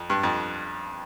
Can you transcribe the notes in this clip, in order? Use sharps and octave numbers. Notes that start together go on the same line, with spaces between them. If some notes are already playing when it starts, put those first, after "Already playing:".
Already playing: F2
G2
F2